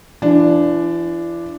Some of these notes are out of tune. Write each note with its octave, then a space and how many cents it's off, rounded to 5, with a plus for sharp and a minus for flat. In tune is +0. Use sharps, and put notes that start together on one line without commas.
E3 +40 D4 +0